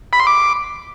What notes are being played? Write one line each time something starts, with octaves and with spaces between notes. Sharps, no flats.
B5
C6
D6